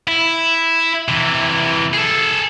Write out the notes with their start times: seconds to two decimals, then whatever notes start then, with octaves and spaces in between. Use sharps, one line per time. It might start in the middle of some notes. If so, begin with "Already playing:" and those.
0.07 E4
1.08 C3 E3
1.94 G#4 A4